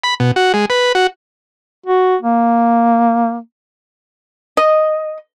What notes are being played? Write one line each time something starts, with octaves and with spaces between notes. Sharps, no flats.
B5
B2
F#4
G#3
B4
F#4
F#4
A#3
D#5